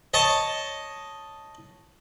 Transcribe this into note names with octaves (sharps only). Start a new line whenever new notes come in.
C#5 D#5 A5